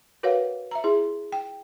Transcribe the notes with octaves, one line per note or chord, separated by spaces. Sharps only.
F#4 A#4 B4 C#5 F5 F#5
E5 A#5
E4 G#4
G5